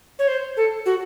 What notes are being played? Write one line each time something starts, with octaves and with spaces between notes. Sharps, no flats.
C#5
C5
A4
F#4